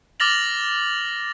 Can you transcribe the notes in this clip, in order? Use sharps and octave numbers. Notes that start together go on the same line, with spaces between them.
D6 F6 A6 A#6 F7 F#7